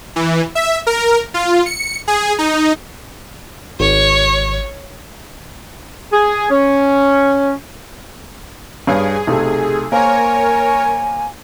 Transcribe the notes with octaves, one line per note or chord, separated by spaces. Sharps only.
E3
E5
A#4
F4
C#7
G#4
D#4
G#1 C#5
G#4
C#4
G2 G#4 C#5 F5
B1 C3 A3
A#3 A#4 C5 C#5 G#5